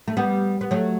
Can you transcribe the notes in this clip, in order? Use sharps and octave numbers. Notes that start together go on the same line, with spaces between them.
A3
G3 B3
B3
F#3 A3